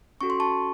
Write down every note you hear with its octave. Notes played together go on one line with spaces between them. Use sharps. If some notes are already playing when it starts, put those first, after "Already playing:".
C#4 F#4 A4 C#6
C6
A5 C#6